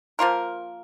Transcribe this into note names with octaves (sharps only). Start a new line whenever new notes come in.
F3 A#3 F4 A#4